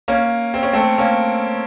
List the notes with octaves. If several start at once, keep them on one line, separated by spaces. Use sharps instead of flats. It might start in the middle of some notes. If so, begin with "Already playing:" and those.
A#3 C#4
C4
C#4
A3 C4
A#3 C#4